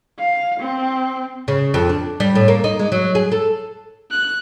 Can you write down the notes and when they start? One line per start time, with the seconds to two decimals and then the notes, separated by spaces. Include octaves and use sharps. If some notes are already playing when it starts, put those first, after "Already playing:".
0.19 F5
0.59 C4
1.48 C#3
1.74 F2
1.89 D4
2.20 G3
2.35 A2
2.48 A#3
2.64 D#4
2.79 G#3
2.92 F#3
3.15 G#4
3.32 A4
4.11 F#6